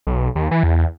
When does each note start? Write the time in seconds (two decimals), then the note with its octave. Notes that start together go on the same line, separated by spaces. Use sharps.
0.07 B1
0.36 D#2
0.51 E3
0.63 E2